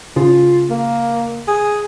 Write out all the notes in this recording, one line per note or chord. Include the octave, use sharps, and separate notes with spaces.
C#3 F4
A#3
G#4